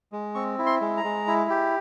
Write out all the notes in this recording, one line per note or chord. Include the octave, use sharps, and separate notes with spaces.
G#3
C4 C#6
E4
C6
G#3
A#5
G#3
E4
G4